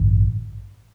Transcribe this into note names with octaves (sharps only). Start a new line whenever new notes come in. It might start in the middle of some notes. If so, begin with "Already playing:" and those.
Already playing: A1 G2 D3